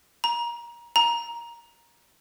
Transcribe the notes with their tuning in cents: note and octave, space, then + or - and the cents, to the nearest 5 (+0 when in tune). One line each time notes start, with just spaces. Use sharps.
A#5 +25
A#5 +10